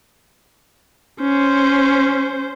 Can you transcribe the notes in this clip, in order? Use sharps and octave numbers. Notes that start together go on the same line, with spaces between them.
C#4 C5